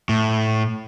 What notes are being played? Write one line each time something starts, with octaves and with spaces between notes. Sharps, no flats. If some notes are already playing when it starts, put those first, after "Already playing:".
A2